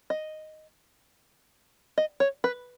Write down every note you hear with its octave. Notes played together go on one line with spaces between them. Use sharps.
D#5
D#5
C#5
B4